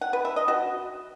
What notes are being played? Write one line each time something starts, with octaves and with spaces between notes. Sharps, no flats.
F#5
B4
E5
D#5
F#4